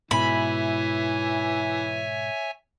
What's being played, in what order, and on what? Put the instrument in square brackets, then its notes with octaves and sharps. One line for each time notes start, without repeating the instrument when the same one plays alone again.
[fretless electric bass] G#2 B2 [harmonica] E3 [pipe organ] C#5 E5 G#5 [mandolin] B5